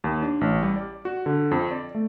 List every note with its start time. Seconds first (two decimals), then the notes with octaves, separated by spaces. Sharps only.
0.04 D#2
0.23 D4
0.41 A1
0.63 G3
0.76 D5
1.05 F#4
1.26 D3
1.51 F2
1.71 D5
1.95 A3